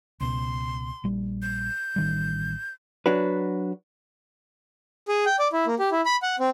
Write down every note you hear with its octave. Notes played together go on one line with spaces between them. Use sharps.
C#2 B2 C6
A#1 G3
G6
A1 D#3 G3
F#3 D4 F#4 B4
G#4
G5
D5
E4
A#3
G4
E4
B5
F#5
C4